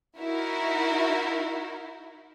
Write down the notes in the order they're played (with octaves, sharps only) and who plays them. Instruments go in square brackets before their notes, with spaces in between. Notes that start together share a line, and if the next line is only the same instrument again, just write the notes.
[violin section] D#4 E4 F#4 A#4